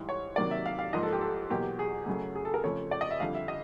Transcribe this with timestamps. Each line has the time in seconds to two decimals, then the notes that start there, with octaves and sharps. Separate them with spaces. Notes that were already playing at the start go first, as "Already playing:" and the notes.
Already playing: G#2 E3 G3
0.09 C#5
0.36 C3 D#3 F#3 A#3 D5
0.51 E5
0.66 F5
0.79 F5
0.93 G#2 F3 A#3 D#5
1.03 A4
1.12 G4
1.21 A4
1.50 E2 B2 F#3 A#3 G4
1.79 G#4
2.06 F#2 C#3 F#3 A3
2.35 G#4
2.45 A4
2.54 A#4
2.64 F2 C#3 F3 A3 C#5
2.91 D5
3.01 D#5
3.11 E5
3.20 F2 D3 G3 F5
3.35 E5
3.48 D#5